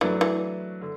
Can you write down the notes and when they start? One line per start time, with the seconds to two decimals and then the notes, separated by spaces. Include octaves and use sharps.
0.01 E3 F#3 A3 D4 B4
0.21 E3
0.81 D3